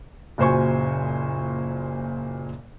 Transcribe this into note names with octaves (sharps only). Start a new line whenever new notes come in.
F#1 A#2 F#4 C5 G#5 C#6